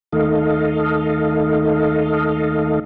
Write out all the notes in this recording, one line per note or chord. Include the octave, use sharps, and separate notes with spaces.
D#2 D#3 A3 A4 D#5 F5